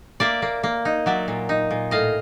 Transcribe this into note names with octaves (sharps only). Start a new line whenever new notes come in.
A#3 D5 E5
A#3
A#3
D#4
F#3 D5 E5
A#2
D#4
A#2
A2 D#5 F5